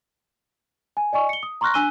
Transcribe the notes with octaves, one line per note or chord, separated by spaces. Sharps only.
G#5
D5 D#5 G#5 C#6
C#7 G7
D#6
A#5 C6 C#6 F6 F#6 A#6
D4 G#5 E6 F#6 D#7 G7